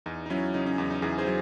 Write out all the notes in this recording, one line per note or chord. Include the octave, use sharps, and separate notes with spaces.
E2 D#4
D#4
F#3 C#4 E4
C#3 D#4
C#4
E2 D#4
D#4
E2 E4 G#4
G#4 C5
F#3